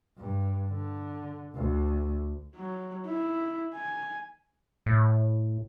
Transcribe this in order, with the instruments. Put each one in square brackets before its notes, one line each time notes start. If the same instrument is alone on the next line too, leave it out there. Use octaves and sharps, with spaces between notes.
[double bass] G2
D3
D2
[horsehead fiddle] F#3
E4
G#5
[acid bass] A2